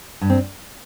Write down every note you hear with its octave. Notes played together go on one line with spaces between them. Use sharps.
G2
C4